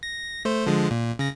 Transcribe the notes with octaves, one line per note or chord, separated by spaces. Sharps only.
A#6
A3 C5
D3 F3 G#3
A#2
C#3 A#6